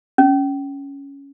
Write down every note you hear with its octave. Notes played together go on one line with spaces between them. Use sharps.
C#4